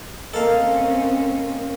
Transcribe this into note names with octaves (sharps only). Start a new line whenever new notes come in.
A#3 C4 C#4 A4 A#4 D#5 F5